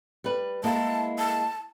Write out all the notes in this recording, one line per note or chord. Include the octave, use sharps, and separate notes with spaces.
G3 B4
G#3 A#3 E4 A5
A5